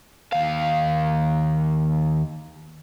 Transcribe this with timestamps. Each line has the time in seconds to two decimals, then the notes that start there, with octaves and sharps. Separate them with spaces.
0.33 D#2 F5